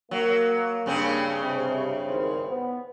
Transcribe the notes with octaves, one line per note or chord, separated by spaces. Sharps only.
F#3 A#3
G2 C#3 C4
C3
G#1 E2 C5
B3